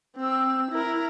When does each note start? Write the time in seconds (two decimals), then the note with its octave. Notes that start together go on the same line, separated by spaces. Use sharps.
0.17 C4 E6
0.71 E4 A#4